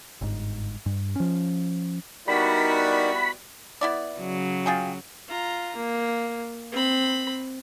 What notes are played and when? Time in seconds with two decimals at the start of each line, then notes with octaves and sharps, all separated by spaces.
0.21 G1 G#2
0.86 G2
1.16 F3 C#4
2.28 G3 B3 D#4 E4 F#4 A#4 D5 B5
3.81 B3 E4 D5
4.18 C#3 F#3
4.66 F4 G#4 G5
5.28 F4 A#5
5.76 A#3
6.72 C4 B5